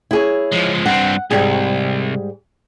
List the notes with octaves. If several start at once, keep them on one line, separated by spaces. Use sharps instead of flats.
E4 G#4 C#5
F3 G#3
G2 C4 F#5
C2 G#2 G3 G#4